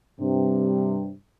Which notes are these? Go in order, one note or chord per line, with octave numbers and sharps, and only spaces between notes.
G2 C3